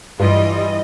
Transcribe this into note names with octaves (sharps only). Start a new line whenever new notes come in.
G2 E3 G3 F4 D#5